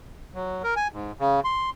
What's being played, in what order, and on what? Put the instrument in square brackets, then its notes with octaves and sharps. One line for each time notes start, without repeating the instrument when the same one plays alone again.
[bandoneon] F#3
A#4
G#5
G#2
C#3
C6